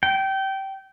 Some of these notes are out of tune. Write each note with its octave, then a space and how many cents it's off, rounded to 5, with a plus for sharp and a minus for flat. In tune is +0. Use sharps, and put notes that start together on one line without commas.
G5 -20